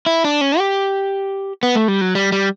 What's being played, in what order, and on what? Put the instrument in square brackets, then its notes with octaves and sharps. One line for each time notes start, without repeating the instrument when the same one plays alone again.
[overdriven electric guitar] E4
D4
C#4
G4
B3
A3
G3
F#3
G3
G3